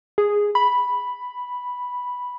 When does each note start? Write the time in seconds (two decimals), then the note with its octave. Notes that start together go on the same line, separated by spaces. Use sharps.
0.18 G#4
0.55 B5